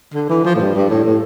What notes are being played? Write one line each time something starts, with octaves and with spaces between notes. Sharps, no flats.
D3
E3
F3
A2
G2
G2
A2
A2